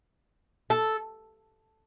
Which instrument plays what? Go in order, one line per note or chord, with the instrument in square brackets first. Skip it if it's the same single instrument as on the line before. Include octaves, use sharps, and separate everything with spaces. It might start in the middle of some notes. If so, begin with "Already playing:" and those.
[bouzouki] A4